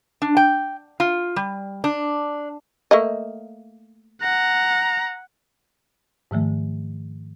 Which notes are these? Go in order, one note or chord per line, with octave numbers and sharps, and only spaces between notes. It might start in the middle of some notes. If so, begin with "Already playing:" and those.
D4
G5
F4
G3
D4
A3 A#3 D#5
F#5 A#5
G#2 D#3 F3 A3